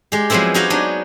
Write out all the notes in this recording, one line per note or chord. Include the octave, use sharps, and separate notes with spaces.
G#3 G4
F3 F#3 G#3 B3 C4 E4
D#4 F#4 G4 D#5 F5 G#5
F#3 B3 D4 D#4